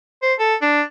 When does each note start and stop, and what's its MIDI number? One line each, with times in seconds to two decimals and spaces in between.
0.22 0.33 72
0.39 0.55 69
0.62 0.82 62